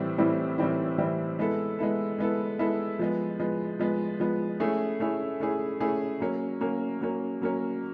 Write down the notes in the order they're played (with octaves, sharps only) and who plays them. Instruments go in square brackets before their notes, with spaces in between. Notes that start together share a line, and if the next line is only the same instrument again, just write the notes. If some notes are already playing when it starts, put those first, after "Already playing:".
Already playing: [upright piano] A2 E3 G3 C4 E4
A2 E3 G3 C4 E4
A2 E3 G3 C4 E4
A2 E3 G3 C4 E4
G#3 B3 E4 A4
G#3 B3 E4 A4
G#3 B3 E4 A4
G#3 B3 E4 A4
F3 G#3 B3
F3 G#3 B3
F3 G#3 B3
F3 G#3 B3
A3 C#4 E4 G#4
A3 C#4 E4 G#4
A3 C#4 E4 G#4
A3 C#4 E4 G#4
F#3 A#3 C#4
F#3 A#3 C#4
F#3 A#3 C#4
F#3 A#3 C#4